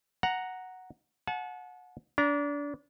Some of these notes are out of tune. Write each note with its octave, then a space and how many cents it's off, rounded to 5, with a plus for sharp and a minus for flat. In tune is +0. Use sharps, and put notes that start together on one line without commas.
F#5 +0 A#5 +0
F#5 -25 A5 -40
D4 -25 A#5 +20